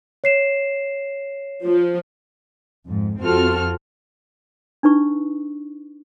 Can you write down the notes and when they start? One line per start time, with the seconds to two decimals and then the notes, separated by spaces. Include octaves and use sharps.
0.24 C#5 C7 E7
1.65 F3
2.86 F2 G#2
3.19 F2 C4 F4 F#4 A4 F6
4.83 D4 D#4 B4 C#6